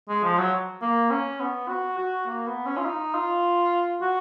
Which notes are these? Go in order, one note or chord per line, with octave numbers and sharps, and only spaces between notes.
G#3
F3
F#3
A#3
C#4
B3
F#4
F#4
A#3
B3
C#4
F4
D#4
F4
F#4